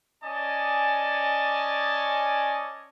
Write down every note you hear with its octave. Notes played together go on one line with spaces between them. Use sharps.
C#4 D5 D#5 G#5 A5